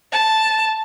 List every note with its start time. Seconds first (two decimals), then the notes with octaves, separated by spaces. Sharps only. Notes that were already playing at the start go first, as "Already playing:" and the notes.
0.12 A5